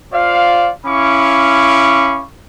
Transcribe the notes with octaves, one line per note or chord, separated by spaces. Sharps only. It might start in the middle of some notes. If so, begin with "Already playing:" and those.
F4 C5 D5 F5
C#4 E4 F5 B5 C#6 D6